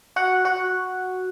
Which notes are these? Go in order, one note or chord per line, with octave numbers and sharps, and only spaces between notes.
F#4 F#5
F#4 F#5